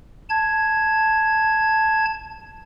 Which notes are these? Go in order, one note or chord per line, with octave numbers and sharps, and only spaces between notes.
A5 G#6